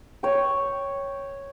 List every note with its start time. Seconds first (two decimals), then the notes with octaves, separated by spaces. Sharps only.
0.23 C#5 G5